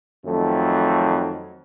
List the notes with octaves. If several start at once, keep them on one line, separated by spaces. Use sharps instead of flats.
F2 D#3 F#3 A3